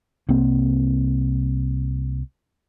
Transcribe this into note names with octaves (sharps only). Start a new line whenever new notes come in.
C2 A#3 C4